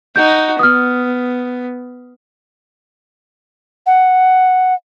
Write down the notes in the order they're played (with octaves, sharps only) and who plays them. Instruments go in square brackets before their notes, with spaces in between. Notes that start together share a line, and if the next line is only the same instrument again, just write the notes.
[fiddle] D#4 F#4 [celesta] G6
[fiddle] B3 [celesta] D#6 F6
[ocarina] F#5